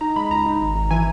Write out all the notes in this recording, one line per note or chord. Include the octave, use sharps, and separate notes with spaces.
D#4 A#5
G#3 B5
C#2 A#5
D#4
G#1
G#1
E3 G#5